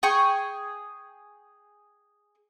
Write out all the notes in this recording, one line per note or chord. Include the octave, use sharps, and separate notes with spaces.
G#4 G5 G#5 C#6